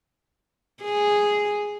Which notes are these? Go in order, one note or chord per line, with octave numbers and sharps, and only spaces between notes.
G#4